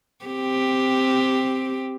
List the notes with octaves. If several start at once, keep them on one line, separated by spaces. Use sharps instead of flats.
C4 G4